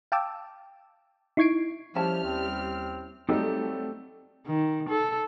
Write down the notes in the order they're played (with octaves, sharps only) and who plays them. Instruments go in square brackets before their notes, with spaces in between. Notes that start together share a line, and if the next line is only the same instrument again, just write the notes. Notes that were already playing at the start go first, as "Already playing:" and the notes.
[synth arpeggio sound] F5 G5 A5 D6 E6
D#4 E4 C#6 G#6 C7 D7
[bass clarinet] F3 [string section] G3 F6 [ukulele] C#4 E4 A5
[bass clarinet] D#2 [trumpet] C4
[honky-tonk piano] F#3 G3 A3 [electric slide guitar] C4 G4 A4 [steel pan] D#4
[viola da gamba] D#3
A4